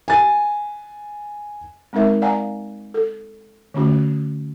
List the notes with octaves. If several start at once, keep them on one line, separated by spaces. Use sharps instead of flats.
G#5 A6
G#3 C4 D#4 A#4 E5
D5 F5 F#5 G#5 A#5
A4
D3 A3 C#4 F#4